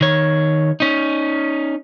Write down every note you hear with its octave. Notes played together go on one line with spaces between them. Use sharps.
D#3 C#5
C#4 D#4